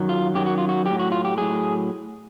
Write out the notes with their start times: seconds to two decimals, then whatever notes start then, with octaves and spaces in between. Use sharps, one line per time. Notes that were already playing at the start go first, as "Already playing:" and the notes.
Already playing: F#2 D#3 F#3
0.09 F4
0.34 F#2 D#3 F#3 G4
0.46 F#4
0.58 F4
0.69 F#4
0.85 F#3 G4
0.90 A2
0.99 F#4
1.12 F4
1.25 G4
1.37 A2 F#3 G#4